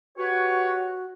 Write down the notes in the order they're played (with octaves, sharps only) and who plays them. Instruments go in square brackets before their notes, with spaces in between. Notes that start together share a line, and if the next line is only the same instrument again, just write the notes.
[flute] F#4 [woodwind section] G4 B4 C#5